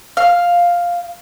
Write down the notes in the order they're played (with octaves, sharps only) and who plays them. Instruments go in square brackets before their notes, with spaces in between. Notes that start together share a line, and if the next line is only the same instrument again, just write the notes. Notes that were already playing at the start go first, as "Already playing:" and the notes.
[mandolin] F5